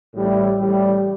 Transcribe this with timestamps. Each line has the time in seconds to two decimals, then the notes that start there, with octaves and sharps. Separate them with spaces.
0.13 A1 A2 G3 E4
0.58 A1 A2 G3